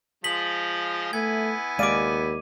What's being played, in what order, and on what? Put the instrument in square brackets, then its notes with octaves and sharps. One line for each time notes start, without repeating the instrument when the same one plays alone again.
[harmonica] F3 G#3 F4 [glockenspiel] B6 F#7
[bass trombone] A3 [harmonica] B3 E4 G#5 [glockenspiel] G#6
[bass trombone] D#2 [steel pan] G#3 D5 F5 [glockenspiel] D6 D#7